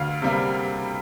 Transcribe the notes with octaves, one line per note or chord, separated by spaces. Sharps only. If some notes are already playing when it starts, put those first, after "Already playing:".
Already playing: D2 F5
C3 G3 A#3